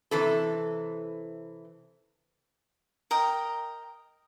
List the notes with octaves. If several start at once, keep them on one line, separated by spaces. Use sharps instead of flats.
C3 E3 A4
A#4 D#5 G5